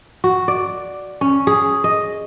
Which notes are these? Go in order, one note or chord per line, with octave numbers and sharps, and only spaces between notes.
F#4
D5
C#4
G#4
D#5